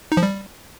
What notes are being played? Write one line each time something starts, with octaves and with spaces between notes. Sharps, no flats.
D#4
F3
G3